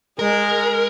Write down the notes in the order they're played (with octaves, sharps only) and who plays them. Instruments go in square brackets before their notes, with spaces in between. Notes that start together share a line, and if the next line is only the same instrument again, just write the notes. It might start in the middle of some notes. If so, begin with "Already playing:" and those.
[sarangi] G#3 [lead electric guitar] A#4